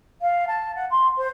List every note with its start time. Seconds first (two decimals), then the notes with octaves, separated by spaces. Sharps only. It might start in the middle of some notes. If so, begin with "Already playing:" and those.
0.21 F5
0.47 A5
0.75 F#5
0.90 C6
1.17 C5